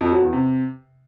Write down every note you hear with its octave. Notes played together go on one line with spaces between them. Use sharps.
F2
F#3
E2
C3